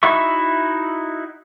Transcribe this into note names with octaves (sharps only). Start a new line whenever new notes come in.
D#4 E4 F#4 E5 C#6